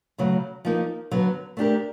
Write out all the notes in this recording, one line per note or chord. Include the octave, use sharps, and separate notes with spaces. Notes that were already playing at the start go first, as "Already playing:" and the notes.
C#3 F#3 A3
F3 A#3 D#4
D3 F#3 B3
A3 D4 G4 A#4